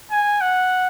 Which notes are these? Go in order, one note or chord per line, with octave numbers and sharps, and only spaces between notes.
G#5
F#5